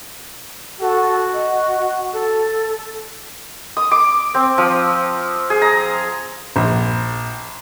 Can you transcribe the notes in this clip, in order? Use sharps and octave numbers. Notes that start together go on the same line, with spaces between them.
F#4 A4
D#5
A4
D#6
D6
C4
F3
G#4
A#5
A#1